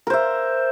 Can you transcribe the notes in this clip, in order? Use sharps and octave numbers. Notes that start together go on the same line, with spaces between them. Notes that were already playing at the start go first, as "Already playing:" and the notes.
A#4 C5 E5